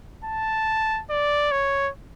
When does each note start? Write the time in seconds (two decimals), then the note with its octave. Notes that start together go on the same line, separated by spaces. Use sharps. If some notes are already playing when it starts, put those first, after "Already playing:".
0.25 A5
1.10 D5
1.51 C#5